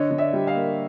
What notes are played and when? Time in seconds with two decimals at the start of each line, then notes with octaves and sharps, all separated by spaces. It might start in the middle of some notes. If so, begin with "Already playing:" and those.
Already playing: D3 C#5 D#5
0.11 D3
0.18 D5 E5
0.33 G3
0.47 D#5 F5
0.55 A#3